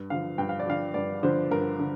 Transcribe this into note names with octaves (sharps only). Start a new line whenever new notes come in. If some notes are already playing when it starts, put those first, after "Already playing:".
Already playing: G2
D3 F3 F5
G2 G5
F5
D5
D3 F3 F5
G2 D5
D3 F3 C5
G2 A#4
D3